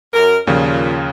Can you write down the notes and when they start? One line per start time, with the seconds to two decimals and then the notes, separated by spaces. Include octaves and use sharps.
0.14 F#2 A#4
0.47 D#2 A#2 C#3 F3